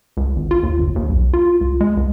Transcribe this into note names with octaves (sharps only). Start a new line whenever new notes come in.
C#2
G#1
F4
D#2
G1
D#2
B1
F4
C#2
G#3
C#2